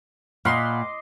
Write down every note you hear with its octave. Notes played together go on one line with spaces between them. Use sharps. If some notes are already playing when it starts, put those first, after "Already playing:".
A#2 D#5 F5 F#5 B5 C6 D6